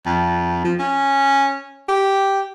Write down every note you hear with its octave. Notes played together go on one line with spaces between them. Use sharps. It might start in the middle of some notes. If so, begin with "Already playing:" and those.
F2
F3
C#4
G4